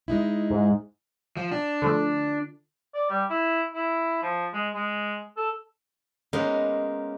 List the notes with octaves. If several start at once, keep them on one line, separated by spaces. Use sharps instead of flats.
G#3 D#4 E4
G#2
F3
D4
D3 F3 A3
D5
G3
E4
E4
F3
G#3
G#3
A4
G#3 A#3 B3 C#4 D#4 F4